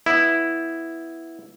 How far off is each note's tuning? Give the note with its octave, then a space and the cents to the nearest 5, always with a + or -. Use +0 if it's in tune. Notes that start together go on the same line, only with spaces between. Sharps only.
B3 +0 E4 +0